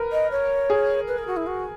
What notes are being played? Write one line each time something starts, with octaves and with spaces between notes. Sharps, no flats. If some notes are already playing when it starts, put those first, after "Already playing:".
Already playing: A#4 B4
D#5
C#5
G#4
B4
A#4
F#4
E4
F#4